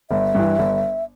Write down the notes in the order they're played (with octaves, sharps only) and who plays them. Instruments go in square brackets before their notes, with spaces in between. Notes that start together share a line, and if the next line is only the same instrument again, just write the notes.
[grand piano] G1 [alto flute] E5
[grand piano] G2 E3
G1